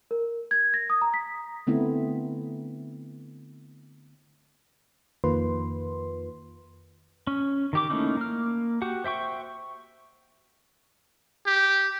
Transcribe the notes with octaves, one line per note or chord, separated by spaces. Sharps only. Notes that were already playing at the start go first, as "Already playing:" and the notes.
A#4
G#6
A#6
D#6
A#5
B6
D3 A3 B3 C4 E4
F2 D#3 A#3 F4 B4 C6
C#4
D#3 G4 D6
A3 A#3 C#4 D#4 E4
A#3 F6
F#4 G4 F#5
C5 E5 G5 C#6
G4